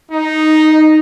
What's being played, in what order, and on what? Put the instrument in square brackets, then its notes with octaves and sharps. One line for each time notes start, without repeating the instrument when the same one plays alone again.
[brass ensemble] D#4